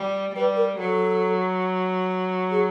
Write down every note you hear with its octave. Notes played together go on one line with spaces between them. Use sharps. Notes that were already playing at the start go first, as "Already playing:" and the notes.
Already playing: G3
G3 B4
A#4
F#3 A4
G#4